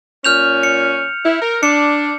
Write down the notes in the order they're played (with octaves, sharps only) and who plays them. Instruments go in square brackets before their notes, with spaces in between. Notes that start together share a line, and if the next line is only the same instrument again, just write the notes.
[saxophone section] A#2 C#4 [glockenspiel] F6 G6 F7
[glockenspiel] C#7
[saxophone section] E4
A#4
[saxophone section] D4 [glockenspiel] C#7